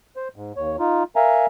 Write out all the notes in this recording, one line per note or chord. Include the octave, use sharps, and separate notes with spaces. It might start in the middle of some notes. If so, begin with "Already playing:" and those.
C5
G#2
D#2 C#5
D#4 F4
A#4 E5 F5 G#5 A#5